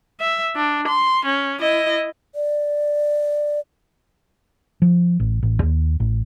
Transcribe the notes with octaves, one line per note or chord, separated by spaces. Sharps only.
E5
D4
C6
C#4
E4 D#5
D5
F3
A1
A1
D#2
A1